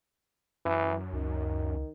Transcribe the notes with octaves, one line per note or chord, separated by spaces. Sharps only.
F#2 E3
C#2 D#3